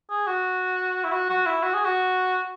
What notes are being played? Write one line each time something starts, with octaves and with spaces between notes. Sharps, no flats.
G#4
F#4
E4
F#4
F#4
E4
F#4
G#4
F#4